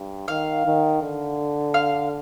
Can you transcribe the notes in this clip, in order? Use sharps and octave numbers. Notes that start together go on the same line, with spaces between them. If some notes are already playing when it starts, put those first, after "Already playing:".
Already playing: G2
D#3 F5
D#3
D3
F5